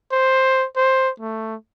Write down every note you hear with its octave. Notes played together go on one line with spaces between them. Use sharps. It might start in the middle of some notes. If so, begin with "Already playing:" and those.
C5
C5
A3